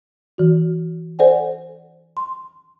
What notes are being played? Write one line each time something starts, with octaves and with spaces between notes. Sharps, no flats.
E3 F#4
A4 C5 D5 F#5 G#5
C6